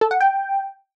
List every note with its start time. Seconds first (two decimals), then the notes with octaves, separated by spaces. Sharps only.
0.01 A4
0.11 F#5
0.20 G5